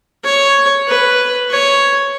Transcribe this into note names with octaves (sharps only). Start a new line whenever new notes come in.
C#5
B4
C#5